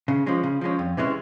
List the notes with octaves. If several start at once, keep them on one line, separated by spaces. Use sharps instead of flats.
C#3
F3 G#3 C#4
C#3
F3 G#3 C#4
F2
C3 E3 G#3 C#4